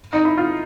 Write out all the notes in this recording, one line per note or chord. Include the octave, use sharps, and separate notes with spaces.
D#4
E4
F4